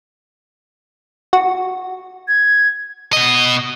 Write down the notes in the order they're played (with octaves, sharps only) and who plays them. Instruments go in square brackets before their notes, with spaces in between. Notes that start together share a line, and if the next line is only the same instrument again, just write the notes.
[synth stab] F#4
[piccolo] G#6
[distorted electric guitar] B2 D#5